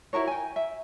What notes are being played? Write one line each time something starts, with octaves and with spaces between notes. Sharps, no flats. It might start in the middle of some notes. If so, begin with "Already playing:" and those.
E4 F#4 A#4 C#5
G5 G#5
E5